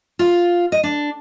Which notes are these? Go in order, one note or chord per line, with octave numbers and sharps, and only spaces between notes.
F4
D#5
D4